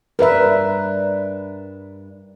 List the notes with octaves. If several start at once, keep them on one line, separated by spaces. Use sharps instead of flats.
G2 D4 A#4 B4 E5